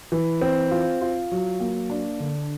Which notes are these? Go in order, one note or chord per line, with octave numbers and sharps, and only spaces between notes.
E3
C4
F4
F4
F#3
A#3
D4
D3